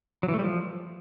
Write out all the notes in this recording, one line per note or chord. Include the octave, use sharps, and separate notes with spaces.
F#3
E3
A3
G3
F3